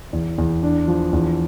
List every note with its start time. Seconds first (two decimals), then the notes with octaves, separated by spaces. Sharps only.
0.13 E2
0.38 E2
0.63 D4
0.88 F3
1.13 E2